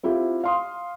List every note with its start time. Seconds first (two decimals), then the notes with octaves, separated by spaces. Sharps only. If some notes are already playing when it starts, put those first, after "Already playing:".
0.03 C4 E4 F4 G4
0.44 F5 C6 D#6